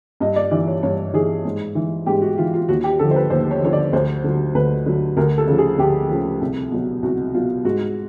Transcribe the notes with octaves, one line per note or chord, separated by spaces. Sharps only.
G2 D#5
D5
E3 D5
C#5
G2 C#5
E3 G#4
G#2
E3
G#2 G4
F#4
E3 F4
F4
D#2 F#4
G4
D3 F3 A4
C5
B4
D#2 C5
C#5
D3 F3 C#5
D5
D2 C5
D3 F#3
D2 B4
D3 F#3
D2 A#4
A4
C#3 F3
G#4
D2 G4
C#3 F3
C2
B2 F#3
C2 F#4
B2 F#3 F4
G#2 F#4